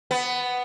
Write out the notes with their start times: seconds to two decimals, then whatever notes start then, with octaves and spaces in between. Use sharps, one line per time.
0.11 B3